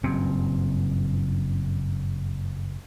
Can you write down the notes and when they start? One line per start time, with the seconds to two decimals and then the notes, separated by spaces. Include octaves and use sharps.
0.03 F#1 G2 A#2 C4